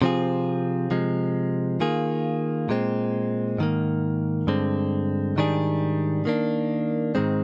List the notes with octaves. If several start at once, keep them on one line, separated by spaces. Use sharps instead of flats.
C3 F3 C4 F4 G#4
C3 F3 G#3
D#3 A#3 F4 G#4
A#2 G#3 C4
G#2 D#3 A#3
G2 D3 G#3 C4
G#2 D#3 G3 D4 G#4
D#3 A#3 D4
G#2 D#3 G#3 C4